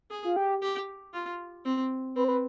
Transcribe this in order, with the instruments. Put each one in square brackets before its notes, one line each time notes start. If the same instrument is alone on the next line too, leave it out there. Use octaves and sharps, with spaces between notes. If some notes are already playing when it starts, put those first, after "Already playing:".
[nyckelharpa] G#4
[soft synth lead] F4
G4
[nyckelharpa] G4
F4
C4
[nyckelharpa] C4 [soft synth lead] B4
[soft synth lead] C5
B4